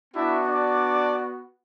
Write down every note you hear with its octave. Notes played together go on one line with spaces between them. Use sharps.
B3 D4 E4 F#4 E5
D4 D5